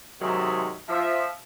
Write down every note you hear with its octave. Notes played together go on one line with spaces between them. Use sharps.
G#2 C3 D#3 F#3 G#3 A3
F3 E5